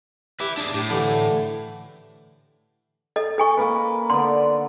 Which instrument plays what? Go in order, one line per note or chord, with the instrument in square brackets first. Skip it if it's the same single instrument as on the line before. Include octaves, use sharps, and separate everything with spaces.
[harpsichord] G4 [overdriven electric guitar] B4 E5
[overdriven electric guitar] D4 G#4
[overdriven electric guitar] A2 [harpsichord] G4
[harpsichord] D3 E3 G4
[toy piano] A4 D#5
A4 G#5 C#6
[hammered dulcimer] A#3 A#4 B4
[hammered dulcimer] D3 B3 [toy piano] C6